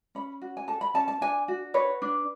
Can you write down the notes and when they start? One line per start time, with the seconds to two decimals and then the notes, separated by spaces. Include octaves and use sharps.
0.15 C#4 B5
0.42 F#4
0.57 G#5
0.68 A4 A5
0.81 B5
0.94 C#4 A5
1.08 A5
1.21 D4 G#5
1.48 F#4
1.74 B4 C#5
2.02 D4